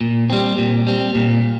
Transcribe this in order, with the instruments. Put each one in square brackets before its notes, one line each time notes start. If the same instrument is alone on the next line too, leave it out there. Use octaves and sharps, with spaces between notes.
[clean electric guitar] A#2
G3 C4
A#2
G3 C4
A#2